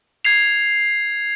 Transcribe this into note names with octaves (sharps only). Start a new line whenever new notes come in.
G#6 C7 F7